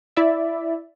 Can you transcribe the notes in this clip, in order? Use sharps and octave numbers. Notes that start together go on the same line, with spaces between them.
E4 D5 E5